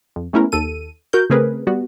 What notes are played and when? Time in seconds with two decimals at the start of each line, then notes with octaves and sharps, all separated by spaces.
0.16 F2
0.33 G#3 A3 B3 C#4 E4 A#4
0.52 D#2 A4 D#7
1.13 F#4 A#4 G6
1.30 C#3 A3 C4 G#4 A#4 B4
1.67 G3 B3 F#4